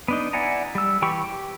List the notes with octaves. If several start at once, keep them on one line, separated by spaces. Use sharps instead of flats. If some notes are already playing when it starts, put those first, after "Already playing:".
B3 D4 D#4
E4 D5 F#5 G#5 A#5
G3 E6
E3 G4 G5 B5 C#6
G4